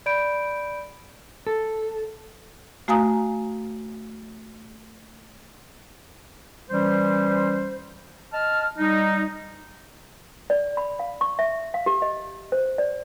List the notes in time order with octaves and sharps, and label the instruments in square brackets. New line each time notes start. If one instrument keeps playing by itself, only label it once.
[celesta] D5 B5 G6 D7
[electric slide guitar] A4
[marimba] A3 F#4 F5 G#5 A#5 D#6
[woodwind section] E3 G3 C#4 C5
D#5 A5 F6
G3 D#4
[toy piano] D5
B5
F5
C#6
E5
F5
G4
D#5
C5
D5